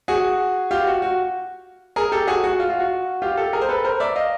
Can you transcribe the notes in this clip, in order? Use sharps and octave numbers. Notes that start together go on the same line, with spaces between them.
F#4 G#4
F4 G4
F#4
F#4
G#4 A#4
G4 A4
F#4 G#4
F#4
F4
F4
F#4
F4 G4
G4 A4
G#4 A#4
C5
A4 B4
A#4 C5
D5 E5
D#5 F5